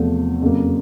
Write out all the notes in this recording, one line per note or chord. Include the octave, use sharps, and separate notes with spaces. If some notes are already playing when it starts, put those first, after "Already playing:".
Already playing: E2 C3 F3 A3
F2 C#3 F#3 A#3